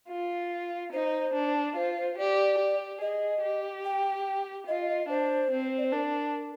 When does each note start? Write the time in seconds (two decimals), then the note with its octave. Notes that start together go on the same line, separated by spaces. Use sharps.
0.09 F4
0.93 D#4 C5
1.34 D4
1.76 F4 C5
1.97 C5
2.18 G4 D5
2.59 G4
3.01 G#4 D#5
3.42 G4
3.84 G5
4.67 F4 D#5
4.89 D#5
5.09 D4 C5
5.51 C4
5.78 D5
5.85 C5
5.92 D4 A#4